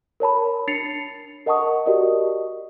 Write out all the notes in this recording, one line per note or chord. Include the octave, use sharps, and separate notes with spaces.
A#4 C#5 A5 B5
D4 A6 C7 C#7 F7
A#4 D#5 F#5 A5 C#6 D#6
F#4 G4 A#4 D5 D#5